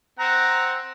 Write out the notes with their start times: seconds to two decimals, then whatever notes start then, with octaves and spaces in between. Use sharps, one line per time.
0.19 C4 F#5 A#5